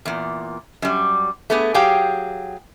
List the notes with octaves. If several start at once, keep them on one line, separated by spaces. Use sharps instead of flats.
E2 A#2
F#2 G3
A3 B3 G#4
F#3 G4 G#4 F5 G5